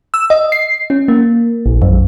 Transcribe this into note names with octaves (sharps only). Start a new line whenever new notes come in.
E6
D#5
C7
C#4
A#3
A#1
F#2